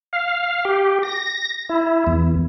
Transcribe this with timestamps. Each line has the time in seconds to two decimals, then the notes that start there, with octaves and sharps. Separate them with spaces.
0.13 F5
0.65 G4
1.03 A#6
1.69 E4
2.07 E2